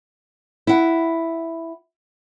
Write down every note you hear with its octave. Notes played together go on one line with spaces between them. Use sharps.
E4 F#5